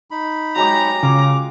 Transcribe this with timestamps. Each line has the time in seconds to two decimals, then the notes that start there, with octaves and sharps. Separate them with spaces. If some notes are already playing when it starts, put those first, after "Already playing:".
0.11 D#4 B5
0.55 F#3 G#3 G4 A#5
1.03 C#3 F4 D6